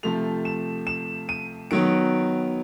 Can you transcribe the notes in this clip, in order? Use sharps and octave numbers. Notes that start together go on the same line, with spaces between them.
C3 F3 A3 F7
E7
E7
D#7
D#3 F#3 B3 D7